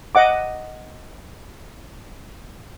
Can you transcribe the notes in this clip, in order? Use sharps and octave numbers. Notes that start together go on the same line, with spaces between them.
D#5 F#5 D6